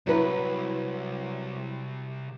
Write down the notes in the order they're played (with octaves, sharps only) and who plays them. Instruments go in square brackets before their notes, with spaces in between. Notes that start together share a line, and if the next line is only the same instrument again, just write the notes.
[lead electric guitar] C2 [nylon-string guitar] F#3 E4 B4